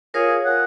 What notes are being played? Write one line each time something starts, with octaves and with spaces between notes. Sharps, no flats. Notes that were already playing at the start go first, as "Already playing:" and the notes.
F4 G#4 A#4 C#5 F5
F#5